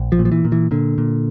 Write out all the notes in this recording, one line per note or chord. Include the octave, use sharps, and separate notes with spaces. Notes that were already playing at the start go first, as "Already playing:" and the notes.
Already playing: A#1
F3
A#2
F3
E3
A#2
E3
A#2 D3
A#2